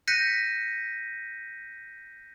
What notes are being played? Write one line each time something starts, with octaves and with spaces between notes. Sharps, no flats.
F#6 G6 A#6 B6 C#7 D#7